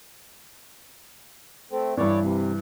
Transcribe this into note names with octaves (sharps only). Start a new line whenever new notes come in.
A3 C4
G2 E3 C#5 D5
C3